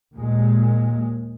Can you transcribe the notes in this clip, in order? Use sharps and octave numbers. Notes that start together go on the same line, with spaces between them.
D#2 A#2 G#3